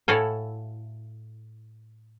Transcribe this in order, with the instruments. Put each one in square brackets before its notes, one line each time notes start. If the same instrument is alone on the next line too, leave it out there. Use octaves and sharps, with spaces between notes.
[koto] A2 E4 F#4 A4 F5 G#5